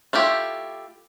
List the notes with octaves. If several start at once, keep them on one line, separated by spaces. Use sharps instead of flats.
A3 E4 F4 G4